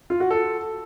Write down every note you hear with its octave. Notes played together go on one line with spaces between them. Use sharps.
F4
F#4
A4